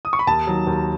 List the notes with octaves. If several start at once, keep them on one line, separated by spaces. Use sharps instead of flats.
D#6
C#6
B5
D#2 A5
D#3 F#3
D#2